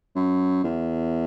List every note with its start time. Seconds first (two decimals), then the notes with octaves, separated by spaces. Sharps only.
0.16 F#2
0.64 E2